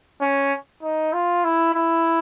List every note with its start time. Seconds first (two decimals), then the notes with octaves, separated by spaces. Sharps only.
0.21 C#4
0.82 D#4
1.13 F4
1.44 E4
1.74 E4